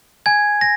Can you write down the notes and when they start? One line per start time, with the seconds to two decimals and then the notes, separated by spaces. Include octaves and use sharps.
0.26 G#5 G#6
0.61 A#6